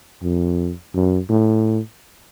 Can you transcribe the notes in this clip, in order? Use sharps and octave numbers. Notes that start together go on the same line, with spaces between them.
F2
F#2
A2